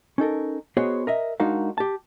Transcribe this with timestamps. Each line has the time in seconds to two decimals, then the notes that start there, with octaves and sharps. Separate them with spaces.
0.18 C#4 D#4 A4 A#4
0.77 B3 F#4 G#4 C5 C#5 D#5
1.07 A#4 D#5 E5
1.40 G#3 D4 D#4 F#4 A#4 F5
1.78 G4 A5